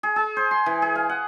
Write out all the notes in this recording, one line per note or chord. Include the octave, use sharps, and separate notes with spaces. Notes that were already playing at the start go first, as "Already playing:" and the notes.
G#4
G#4
C5
C6
E3
G#4
F5
F#5